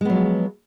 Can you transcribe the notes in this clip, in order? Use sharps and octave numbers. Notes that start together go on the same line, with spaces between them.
F3 F#3 G#3 B3